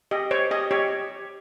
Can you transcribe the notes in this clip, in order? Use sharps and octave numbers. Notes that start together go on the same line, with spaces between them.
G4 D#5
C5 C#5
G4 D#5
G4 C#5